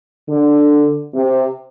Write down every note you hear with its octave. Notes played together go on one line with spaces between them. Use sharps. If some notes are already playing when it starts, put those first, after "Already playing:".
D3
C3